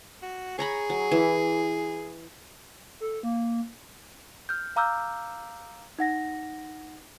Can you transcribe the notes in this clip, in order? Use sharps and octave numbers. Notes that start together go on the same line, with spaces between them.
F#4
G#4 C#5 A#5 B5
F#3
E3
A4
A#3
F6 G6
F5 A#5 D6 E6 F6 G6
D#4 F#5 A#6